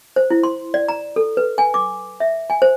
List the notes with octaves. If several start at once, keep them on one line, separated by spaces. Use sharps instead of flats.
C5
E4
C6
D5
A#5
A4
B4
G#5
D6
E5
G#5
C5